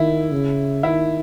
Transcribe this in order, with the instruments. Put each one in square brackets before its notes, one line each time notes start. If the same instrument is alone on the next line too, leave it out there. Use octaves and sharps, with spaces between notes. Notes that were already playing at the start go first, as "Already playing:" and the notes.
Already playing: [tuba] D#3 [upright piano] E4
[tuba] C#3
[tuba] D#3 [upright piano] E4